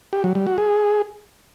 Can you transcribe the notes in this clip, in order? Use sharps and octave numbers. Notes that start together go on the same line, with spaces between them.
G4
F#3
G3
F#4
G#4